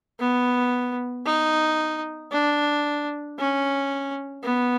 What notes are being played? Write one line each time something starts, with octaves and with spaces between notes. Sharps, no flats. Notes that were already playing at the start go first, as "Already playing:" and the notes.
B3
D#4
D4
C#4
B3